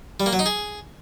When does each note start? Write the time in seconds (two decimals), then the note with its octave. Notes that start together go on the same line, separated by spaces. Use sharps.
0.20 G3
0.26 A#3
0.33 F#3
0.39 D#4
0.46 G#4